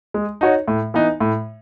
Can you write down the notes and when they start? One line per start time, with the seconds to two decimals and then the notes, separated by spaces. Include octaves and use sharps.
0.14 G#3
0.41 D#4 F#4 C#5
0.68 A2
0.94 E3 B3 D#4
1.20 A2